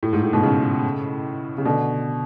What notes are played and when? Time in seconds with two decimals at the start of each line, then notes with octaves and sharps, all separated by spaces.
0.03 A2
0.13 G#2
0.23 A2
0.33 G#2 B2
0.43 A2 C#3
1.58 C#3
1.65 B2 D3